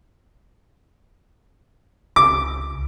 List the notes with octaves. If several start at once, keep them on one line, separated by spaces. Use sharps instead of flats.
C#2 D6